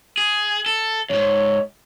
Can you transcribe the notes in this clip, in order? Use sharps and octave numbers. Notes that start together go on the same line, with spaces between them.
G#4
A4
E2 G#2 C#5